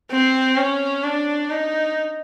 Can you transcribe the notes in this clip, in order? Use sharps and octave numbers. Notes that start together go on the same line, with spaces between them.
C4
C#4
D4
D#4